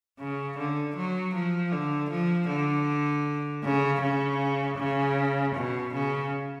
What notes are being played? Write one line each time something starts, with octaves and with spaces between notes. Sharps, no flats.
C#3
D3
F#3
F3
D3
F3
D3
C#3
C#3
C#3
B2
C#3